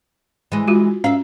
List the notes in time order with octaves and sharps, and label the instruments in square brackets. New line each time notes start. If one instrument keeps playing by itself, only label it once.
[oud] E3 G#3
[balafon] F4 F#4
[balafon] C#4 [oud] E5 F5